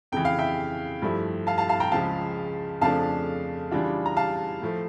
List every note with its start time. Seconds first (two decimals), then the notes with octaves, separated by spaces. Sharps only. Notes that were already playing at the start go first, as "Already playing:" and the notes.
0.12 F2 C#3 E3 G5
0.25 F5
0.39 E5 G5
1.02 G2 F3 A3 E4
1.47 F5 A5
1.58 F5 A5
1.69 F5 A5
1.80 G5 A#5
1.92 C#2 C#3 F3 F5 A5
2.81 F2 C#3 F3 A3 D4 F5 A5
3.71 C#3 E3 G3 D4 F4
4.06 A#5
4.17 F5 A5
4.62 A2 F3 A3